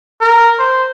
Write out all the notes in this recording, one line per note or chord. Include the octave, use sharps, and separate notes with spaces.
A#4
C5